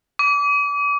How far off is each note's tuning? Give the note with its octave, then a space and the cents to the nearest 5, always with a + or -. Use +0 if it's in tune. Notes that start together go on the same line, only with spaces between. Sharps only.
D6 -30